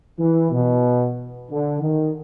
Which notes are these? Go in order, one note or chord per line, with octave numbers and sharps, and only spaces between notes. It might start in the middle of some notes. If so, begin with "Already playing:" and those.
E3
B2
D3
D#3